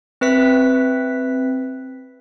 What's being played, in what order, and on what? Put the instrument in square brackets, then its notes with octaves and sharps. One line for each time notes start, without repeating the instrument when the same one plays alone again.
[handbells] C4 B4 E5 B6